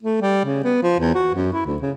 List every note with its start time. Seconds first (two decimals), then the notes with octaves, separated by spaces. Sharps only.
0.03 A3
0.22 G3
0.45 C#3
0.64 B3
0.83 F3
1.00 E2
1.15 F#4
1.34 F#2
1.53 E4
1.66 D2
1.82 C#3